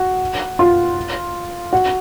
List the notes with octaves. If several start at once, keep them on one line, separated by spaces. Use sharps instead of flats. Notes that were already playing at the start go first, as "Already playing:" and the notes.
Already playing: F#4
F4
F#4